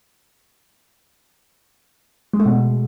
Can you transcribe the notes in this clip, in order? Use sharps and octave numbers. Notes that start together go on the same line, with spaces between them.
G#3
A3
B2